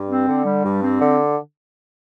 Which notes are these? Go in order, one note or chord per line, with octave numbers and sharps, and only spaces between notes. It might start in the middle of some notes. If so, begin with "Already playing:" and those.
Already playing: G2
C4
D3
G3
G2
C4
D3